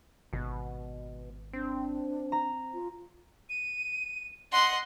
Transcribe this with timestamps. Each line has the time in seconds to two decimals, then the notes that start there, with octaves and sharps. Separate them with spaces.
0.33 G#1 B2
1.53 C4 D4
2.32 A#5
2.74 F4
3.49 D#7
4.52 D#5 F#5 C6